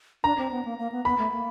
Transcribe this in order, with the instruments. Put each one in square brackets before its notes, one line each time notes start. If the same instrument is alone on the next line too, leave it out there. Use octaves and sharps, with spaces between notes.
[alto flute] D4 [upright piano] A#5
[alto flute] C4
B3
A#3
A#3
B3
[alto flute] B3 [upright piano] B5
[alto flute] A3
A#3